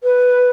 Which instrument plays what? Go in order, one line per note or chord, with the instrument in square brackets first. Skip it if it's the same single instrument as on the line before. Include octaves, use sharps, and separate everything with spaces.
[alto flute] B4